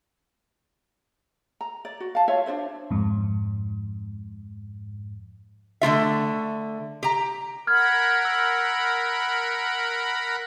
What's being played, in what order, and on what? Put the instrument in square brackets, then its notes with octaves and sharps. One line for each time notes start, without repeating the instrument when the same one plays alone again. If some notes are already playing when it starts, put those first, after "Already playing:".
[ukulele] A#5
D5
F#4
F5 A5
F4 C#5 E5 F5
D4 F4 C5 E5
[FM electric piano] F2 G#2
[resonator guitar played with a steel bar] D3 A3 F4 E5
G4 A#5
[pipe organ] A#4 F#5 B5 [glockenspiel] F6 G#6
[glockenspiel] E6